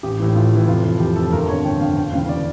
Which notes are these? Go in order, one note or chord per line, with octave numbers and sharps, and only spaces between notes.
A1 G4
A2 E3
A1 F4
A2 E3
F1 F4
F2 E3
F1 G4
F2 E3 A4
G1 A#4
F2 D3 C#5
G1 G5
F2 D3 F5
E1 G5
D2 C#3 E3 F5
D5